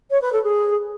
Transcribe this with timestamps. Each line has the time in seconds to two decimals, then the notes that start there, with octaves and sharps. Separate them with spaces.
0.11 C#5
0.22 B4
0.32 A4
0.43 G#4